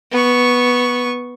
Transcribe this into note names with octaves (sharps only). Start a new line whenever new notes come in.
B3 C#6